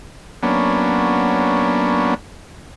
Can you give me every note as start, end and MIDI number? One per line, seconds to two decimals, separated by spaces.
0.43 2.14 54
0.43 2.14 58
0.43 2.14 59
0.43 2.14 61
0.43 2.14 62